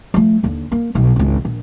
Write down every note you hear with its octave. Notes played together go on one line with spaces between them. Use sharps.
F3 A3
D#2 D3
A#3
B1 B2
G#1 C#2
A#1